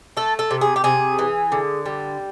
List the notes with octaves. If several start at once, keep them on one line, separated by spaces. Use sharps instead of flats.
A3 A4
A4
C3
G#4
G4
C3 G#4
E3
D3
G3